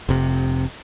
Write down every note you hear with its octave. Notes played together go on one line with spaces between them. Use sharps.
F1 C3